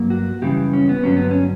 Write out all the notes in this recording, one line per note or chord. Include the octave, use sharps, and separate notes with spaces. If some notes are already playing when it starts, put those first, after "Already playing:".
Already playing: G2 F#3 A#3
F#4
F#2 C#3 E3 G3 G4
C#4
B3
G2 D3 F#3 C#4
B3
C#4